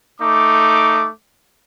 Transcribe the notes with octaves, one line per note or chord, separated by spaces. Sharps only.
A3 D#4 D6